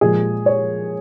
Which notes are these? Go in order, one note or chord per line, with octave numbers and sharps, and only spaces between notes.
A#2 F3 G#3 G#4
C#5